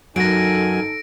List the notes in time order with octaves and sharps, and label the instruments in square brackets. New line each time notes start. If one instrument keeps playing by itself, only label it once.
[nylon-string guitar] F#2 F#4 [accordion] D#3 G#5 [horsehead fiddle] D#4 A4 [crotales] A#6 D7